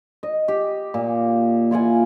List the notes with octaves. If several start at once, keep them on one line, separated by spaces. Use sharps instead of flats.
D#5
G4
A#2
E4 F4 F#5 G#5